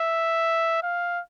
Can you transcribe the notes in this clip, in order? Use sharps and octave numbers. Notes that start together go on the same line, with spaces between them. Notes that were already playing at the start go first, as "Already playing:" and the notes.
Already playing: E5
F5